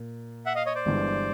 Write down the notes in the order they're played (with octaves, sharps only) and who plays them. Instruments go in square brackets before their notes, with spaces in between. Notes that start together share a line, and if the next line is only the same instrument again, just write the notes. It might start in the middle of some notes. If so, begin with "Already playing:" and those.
Already playing: [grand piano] A#2
[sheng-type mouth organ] E5 F#5
D#5 F5
C#5 D#5
C5 D5
[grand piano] G1 G2 E3 G#3